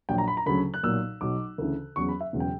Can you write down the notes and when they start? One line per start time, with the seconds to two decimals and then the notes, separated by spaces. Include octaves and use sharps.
0.09 A#1 A#2 F#3 G5
0.18 A#5
0.28 B5
0.37 A#5
0.46 D2 C#3 F#3 B5
0.74 F#6
0.83 B1 A#2 F#3 E6
1.21 B1 B2 F#3 D6
1.58 D2 C#3 E3
1.96 F#1 E2 C#3 F#3 C#6
2.09 B5
2.21 E5
2.33 E1 E2 C#3 F#3
2.40 G5